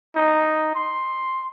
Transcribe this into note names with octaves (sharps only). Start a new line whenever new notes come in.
D#4
C6